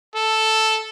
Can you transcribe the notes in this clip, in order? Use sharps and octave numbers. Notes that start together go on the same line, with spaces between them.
A4